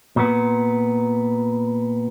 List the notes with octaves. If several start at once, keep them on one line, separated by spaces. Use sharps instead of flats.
A#2 B3